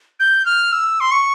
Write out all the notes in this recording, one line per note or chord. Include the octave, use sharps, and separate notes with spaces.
G6
F6
E6
C6
C#6